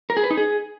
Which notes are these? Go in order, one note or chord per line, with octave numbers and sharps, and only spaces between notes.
A#4
G#4
B4
D#4
G#4